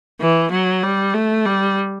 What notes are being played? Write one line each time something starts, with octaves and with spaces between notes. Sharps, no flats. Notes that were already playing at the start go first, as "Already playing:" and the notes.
E3
F#3
G3
A3
G3